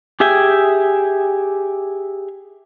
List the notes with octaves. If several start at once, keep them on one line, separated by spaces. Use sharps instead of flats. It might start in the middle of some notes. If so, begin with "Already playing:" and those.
G4 G#4 E5 G5 G#5